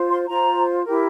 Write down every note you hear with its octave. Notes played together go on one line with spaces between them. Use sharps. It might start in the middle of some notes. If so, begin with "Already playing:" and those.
Already playing: F4 C5
C6
F4 C5 A#5
E4 G4 A#4